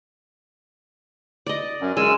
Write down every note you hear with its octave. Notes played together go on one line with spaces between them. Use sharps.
D5 D#5
F#2
F#2 G#3 G#5 E6